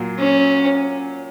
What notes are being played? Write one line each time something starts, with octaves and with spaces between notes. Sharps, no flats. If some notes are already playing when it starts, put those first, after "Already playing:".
Already playing: A#2 F#3
C#4